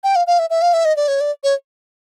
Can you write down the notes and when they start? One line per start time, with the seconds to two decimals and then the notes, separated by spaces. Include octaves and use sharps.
0.04 G5
0.16 F5
0.27 F5
0.39 E5
0.50 E5
0.62 F5
0.73 E5
0.85 D#5
0.96 D5
1.08 C#5
1.21 D5
1.44 C#5